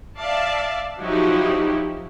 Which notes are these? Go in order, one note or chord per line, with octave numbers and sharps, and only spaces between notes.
D5 E5 F5 A5
F3 F#3 D#4 E4 F#4 G4